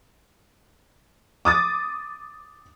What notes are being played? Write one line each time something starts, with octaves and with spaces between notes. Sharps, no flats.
D6 D#6 A6